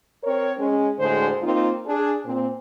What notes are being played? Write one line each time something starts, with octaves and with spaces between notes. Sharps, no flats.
C4 A#4 C#5
G#3 C#4
D2 A2 D3 G#3 C5
A#3 C4 D#4 F4
D4 G#4
A#2 C4